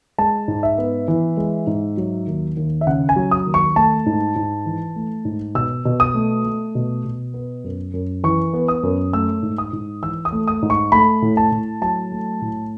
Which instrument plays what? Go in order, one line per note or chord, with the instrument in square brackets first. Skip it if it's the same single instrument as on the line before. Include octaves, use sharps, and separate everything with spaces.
[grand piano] G#3 A5
G#2
E5
B3
E3
G#3
G#2
F#3
D#2
D#2
E5
C#3 F#5
G#5
F#3
D#6
D#2
C#6
A3 A5
G#2
G#2
E3
A3
G#2
B2 E6
B2
D#6
A3
A3
B2
B2
B3
F#2
F#2
E3 C#6
B3
D#6
F#2
A3 E6
G#2
D#6
G#2
E3 E6
D#6
A3
D#6
G#2
C#6
A3 B5
A2
A5
A2
F#3 A5
A3
A2